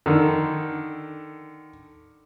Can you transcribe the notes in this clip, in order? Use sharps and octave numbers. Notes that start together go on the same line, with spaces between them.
D3 D#3